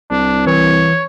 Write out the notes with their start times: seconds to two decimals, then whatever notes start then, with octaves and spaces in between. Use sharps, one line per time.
0.11 C2 D4
0.47 E3 C#5